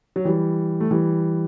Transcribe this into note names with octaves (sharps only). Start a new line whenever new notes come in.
F#3
E3 G3
A3
E3 G3